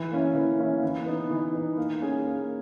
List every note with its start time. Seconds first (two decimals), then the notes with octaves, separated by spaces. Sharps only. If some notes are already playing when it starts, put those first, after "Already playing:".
Already playing: E3
0.11 A#3 C#4 E4
0.35 E3
0.59 A#3 C#4 E4
0.83 E3
1.06 B3 D#4
1.31 E3
1.54 B3 D#4
1.77 A#3
2.01 C#4 G#4
2.25 A#3